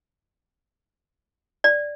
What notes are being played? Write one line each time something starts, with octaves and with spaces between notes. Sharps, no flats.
D5